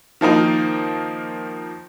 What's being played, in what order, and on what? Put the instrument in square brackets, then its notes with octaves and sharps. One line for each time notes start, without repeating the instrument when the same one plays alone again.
[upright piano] D#3 F3 A#3 D#4